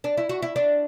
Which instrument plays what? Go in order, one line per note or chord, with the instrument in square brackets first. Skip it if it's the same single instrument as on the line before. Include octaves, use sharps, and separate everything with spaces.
[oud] D4
E4
F#4
E4
D4